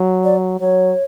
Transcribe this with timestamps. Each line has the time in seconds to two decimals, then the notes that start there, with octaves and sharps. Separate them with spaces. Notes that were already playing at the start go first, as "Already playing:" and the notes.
Already playing: F#3
0.24 D5
0.60 F#3 C#5